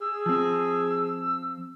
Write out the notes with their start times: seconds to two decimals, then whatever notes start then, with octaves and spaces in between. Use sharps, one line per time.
0.01 G#4 E6
0.26 F3 C4